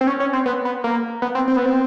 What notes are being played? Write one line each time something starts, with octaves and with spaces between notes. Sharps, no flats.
C4
C#4
C#4
C4
B3
B3
A#3
B3
C4
C4
B3
C4